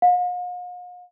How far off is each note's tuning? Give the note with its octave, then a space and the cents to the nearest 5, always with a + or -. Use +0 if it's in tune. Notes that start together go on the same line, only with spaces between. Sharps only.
F5 +45